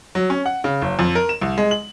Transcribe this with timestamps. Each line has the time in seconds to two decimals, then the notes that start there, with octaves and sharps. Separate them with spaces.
0.15 F#3
0.30 C#4
0.46 F#5
0.64 C#3
0.82 F#1
0.99 F2
1.15 A#4
1.29 E7
1.41 C2
1.58 G#3
1.71 F#7